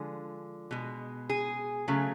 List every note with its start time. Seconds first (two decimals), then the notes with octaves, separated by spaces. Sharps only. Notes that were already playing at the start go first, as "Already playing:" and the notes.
Already playing: D3 F3 G#3
0.71 B2 G#3
1.30 G#4
1.88 C#3 F#3 A3